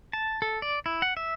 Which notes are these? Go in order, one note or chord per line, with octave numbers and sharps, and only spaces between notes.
A5
A4
D5
E4
F#5
E5